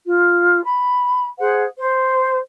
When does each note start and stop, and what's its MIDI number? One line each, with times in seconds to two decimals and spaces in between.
0.05 0.63 65
0.63 1.26 83
1.39 1.63 68
1.39 1.63 72
1.39 1.63 78
1.79 2.36 72